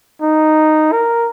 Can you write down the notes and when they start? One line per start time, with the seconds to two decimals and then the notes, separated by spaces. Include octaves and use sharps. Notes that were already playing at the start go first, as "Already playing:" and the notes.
0.21 D#4
0.92 A#4